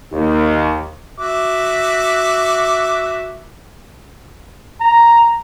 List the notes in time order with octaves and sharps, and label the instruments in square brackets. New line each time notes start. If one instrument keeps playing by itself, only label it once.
[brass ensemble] D#2
[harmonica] F#4 E5 D6
[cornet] A#5